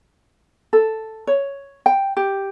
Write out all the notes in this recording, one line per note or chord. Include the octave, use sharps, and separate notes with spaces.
A4
C#5
G5
G4